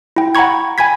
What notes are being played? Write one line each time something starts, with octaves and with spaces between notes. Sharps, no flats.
E4 G5
F#5 G5 A#5 B5 C#6 G#6
G5 G#5 B5 G#6 B6